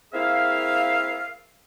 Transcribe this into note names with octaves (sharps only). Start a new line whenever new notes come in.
A#3 C4 E4 G#4 E5 F5